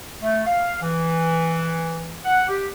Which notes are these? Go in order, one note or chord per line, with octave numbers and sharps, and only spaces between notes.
A3
F5
E3
F#5
G4